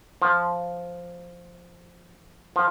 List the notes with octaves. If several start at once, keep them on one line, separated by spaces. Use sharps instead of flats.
F3
F3